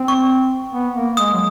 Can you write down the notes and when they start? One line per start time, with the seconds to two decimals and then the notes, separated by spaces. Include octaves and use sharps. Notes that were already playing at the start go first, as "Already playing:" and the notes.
Already playing: C4
0.08 C#6
0.74 B3
0.96 A#3
1.17 G#3 D#6
1.34 F#3